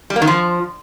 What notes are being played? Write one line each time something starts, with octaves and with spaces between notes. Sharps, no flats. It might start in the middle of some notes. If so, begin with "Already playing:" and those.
G3
A#3
D#3
F3